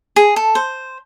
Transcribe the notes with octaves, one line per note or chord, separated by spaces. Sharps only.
G#4
A4
C5